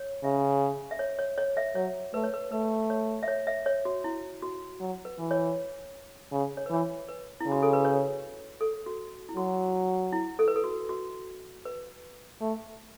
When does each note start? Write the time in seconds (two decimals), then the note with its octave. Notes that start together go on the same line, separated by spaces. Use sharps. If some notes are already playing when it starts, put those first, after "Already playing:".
Already playing: C#5
0.24 C#3 E5
0.91 E5
0.99 C#5
1.19 C#5
1.38 C#5
1.57 E5
1.75 F#3 C#5
2.14 A3 B4
2.24 C#5
2.34 B4
2.51 A3 B4
2.90 C#5
3.23 E5
3.28 C#5
3.47 E5
3.66 C#5
3.85 F#4
4.04 E4
4.43 F#4
4.81 F#3
5.05 B4
5.19 E3
5.31 C#5
6.32 C#3
6.57 C#5
6.66 B4
6.70 E3 C#5
7.09 B4
7.41 E4
7.47 C#3 F#4
7.63 A4
7.73 B4
7.85 C#5
8.61 A4
8.86 F#4
9.29 E4
9.37 F#3 F#4
10.13 E4
10.39 A4
10.48 B4
10.56 A4
10.64 F#4
10.89 F#4
11.65 B4
12.41 A3